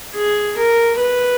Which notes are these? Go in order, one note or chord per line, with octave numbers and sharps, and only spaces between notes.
G#4
A#4
B4